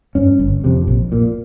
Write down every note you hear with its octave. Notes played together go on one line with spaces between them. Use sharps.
G2 C#4
G1
F2 C3
A#1
A#2